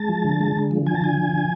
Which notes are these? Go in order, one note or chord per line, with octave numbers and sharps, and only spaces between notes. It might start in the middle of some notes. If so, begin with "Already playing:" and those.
Already playing: G#3 A5
F3
D3
G#3
D3
F3
F3 G#5
A5
D3 G#5
F3
D3